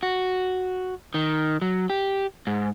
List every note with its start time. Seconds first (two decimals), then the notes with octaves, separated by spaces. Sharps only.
0.03 F#4
1.14 D#3
1.62 F#3
1.90 G4
2.47 G#2